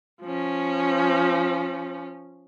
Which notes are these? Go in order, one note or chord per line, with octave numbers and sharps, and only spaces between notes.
F3 C#4